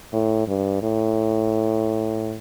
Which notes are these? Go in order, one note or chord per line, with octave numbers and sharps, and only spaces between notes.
A2
G2
A2